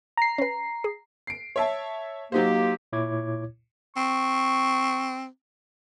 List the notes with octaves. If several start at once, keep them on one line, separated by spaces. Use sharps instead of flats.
A#5 C7
C#4 B4
G#4
C7 D7
C#5 E5 A5
F#3 A#3 D#4 G4 C5
A#2 E4 C#5 D6 G#6
C4 C#6